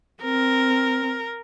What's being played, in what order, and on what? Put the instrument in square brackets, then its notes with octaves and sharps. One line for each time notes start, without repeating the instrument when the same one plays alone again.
[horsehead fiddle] C4 [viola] A#4